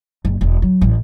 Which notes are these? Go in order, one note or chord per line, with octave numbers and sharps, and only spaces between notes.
F#1
E1
F#3
A1